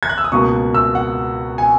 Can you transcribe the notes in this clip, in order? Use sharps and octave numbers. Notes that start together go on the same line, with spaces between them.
G#6
F#6
E6
D#6
C#2 B2 A#3 C#6
E6
F#5
G#5